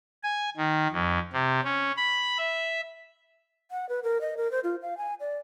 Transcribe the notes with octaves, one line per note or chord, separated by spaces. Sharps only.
G#5
D#3
F2
C3
C#4
B5
E5
F#5
B4
A#4
D#5
A#4
C5
F4
F5
G#5
D5